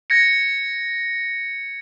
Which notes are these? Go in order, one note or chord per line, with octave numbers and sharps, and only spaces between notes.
G#6 A#6 C#7